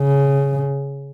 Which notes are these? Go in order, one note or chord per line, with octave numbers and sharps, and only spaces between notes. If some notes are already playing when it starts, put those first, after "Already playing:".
Already playing: C#3